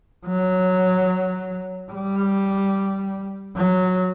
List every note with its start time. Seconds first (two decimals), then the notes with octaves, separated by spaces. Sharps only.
0.27 F#3
1.91 G3
3.56 F#3